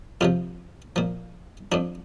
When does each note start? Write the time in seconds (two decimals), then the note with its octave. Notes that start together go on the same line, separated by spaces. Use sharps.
0.21 F2 C3 F3 F4
0.96 A#2 F3
1.72 F2 F3 D4